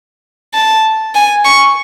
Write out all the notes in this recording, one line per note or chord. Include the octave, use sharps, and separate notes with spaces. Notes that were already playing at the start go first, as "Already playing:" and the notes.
A5
G#5
C#6